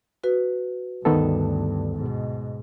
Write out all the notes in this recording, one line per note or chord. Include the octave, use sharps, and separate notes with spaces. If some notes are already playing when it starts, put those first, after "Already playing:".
F#4 B4
D2 G2 D#3 B3 A4
G#2 B2